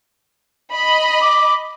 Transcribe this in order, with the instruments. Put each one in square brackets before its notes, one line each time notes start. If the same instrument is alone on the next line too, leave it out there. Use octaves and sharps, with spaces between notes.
[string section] D#5 B5
[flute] D6